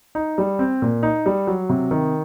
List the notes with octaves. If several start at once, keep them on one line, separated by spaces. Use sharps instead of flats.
D#4
G3
C4
A#2
D#4
G3
F#3
C3
D#3